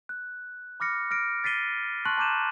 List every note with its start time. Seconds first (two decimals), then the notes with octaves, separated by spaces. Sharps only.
0.09 F#6
0.80 B5 D6 F6 A#6 C#7
1.11 F6 A#6 D7
1.44 A6 B6 C7 D#7 G7
2.05 A5 C6 C#6 F#6 F#7
2.17 A5 A#5 D6 G6 D#7 E7